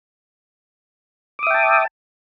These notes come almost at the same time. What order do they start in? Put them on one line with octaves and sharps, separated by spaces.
D6 D#6 E5 G5 A5